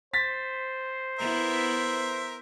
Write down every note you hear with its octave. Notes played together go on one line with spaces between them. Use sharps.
C5 A6 B6
B3 E4 A#4 E5